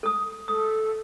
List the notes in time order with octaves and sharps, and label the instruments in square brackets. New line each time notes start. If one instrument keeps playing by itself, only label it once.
[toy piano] A4 D#6
[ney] A4 [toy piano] D#6